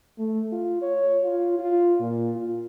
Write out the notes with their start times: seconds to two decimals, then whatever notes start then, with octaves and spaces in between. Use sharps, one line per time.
0.18 A3
0.52 F4
0.82 C#5
1.24 F4
1.59 F4
2.01 A#2
2.36 F4